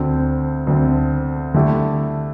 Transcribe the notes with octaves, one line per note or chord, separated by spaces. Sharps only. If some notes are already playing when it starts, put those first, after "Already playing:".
Already playing: D2 D3 C4
D2 D3 C4
D3 A3 E4 G4